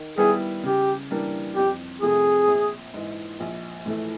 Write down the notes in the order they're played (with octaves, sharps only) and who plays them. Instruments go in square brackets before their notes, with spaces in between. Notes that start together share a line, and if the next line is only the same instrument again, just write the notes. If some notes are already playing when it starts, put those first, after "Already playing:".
Already playing: [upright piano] D#3
[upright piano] G3 B3 E4 [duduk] G#4
[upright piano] C#3 [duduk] G4
[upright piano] E3 G3 A#3 D4
[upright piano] F2 [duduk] G4
[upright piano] C3 F3 A3 [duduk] G#4
[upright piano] A#1
G#2 E3
A#1
A2 E3 A3